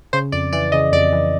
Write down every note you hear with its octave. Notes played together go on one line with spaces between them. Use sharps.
C#3 C5
F2 D5
E3 D5
C#3 D#5
F2 D5
E3